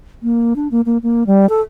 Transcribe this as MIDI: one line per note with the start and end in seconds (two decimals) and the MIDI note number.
0.23 0.53 58
0.56 0.68 62
0.71 0.81 58
0.86 0.98 58
1.03 1.23 58
1.27 1.49 55
1.49 1.61 69